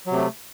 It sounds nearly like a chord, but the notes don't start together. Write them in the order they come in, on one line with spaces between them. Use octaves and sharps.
F#3 C3 A3